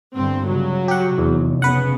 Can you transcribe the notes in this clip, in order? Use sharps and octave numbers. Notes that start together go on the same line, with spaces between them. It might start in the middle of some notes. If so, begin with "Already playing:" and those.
G1 G2 C4
C#3 F#3
G4 F#5
F1 E2
C#3 B3 B4 F#5